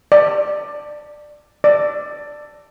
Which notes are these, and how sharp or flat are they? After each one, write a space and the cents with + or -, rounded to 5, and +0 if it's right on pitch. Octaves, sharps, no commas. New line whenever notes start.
D5 +15
D5 +10